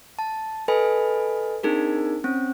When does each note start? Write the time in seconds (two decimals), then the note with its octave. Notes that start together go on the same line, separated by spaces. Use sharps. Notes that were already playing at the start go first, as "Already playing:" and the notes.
0.19 A5
0.68 A4 B4 D#5 G#5 B5
1.63 C4 D4 D#4 G#4 A#4
2.24 C4 C#4